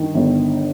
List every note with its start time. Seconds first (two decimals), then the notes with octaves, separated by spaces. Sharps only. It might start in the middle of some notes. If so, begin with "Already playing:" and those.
Already playing: G2 D#3 D#4
0.14 G1